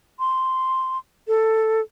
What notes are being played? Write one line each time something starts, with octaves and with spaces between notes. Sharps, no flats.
C6
A4